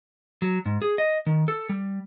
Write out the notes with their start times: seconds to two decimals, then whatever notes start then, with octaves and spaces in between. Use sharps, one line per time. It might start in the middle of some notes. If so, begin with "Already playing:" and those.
0.42 F#3
0.66 G#2
0.82 G#4
0.98 D#5
1.26 D#3
1.48 A4
1.69 G3